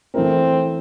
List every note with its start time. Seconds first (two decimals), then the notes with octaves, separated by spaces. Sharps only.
0.14 E3 A3 C4 E4 A#4